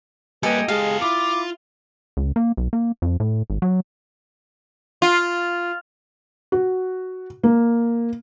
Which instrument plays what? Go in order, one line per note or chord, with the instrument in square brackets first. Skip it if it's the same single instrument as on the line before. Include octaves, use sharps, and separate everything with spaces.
[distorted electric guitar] G3 A#3 [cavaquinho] G4 A4 G#5 [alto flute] B4 [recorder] D#5
[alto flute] G#3 [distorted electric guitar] G4 A4 [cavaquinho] F5
[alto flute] E4 [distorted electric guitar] F4 [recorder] D6
[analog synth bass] C#2
A#3
B1
A#3
F2
A2
G#1
F#3
[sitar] F4
[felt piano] F#4
A#3